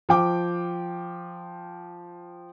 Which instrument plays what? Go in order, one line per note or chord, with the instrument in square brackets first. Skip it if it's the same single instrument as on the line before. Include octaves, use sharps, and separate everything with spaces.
[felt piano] F3 G5 D6